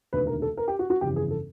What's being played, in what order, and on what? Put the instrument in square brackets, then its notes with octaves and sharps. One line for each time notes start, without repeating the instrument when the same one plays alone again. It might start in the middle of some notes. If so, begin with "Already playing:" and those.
[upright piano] E1 D2 C3 D#3 B4
A#4
A4
A#4
G4
F#4
F#4
G1 F2 C#3 E3 G4
G#4
A4